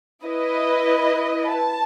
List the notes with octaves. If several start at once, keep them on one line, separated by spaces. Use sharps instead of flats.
E4 B4 D#5
A5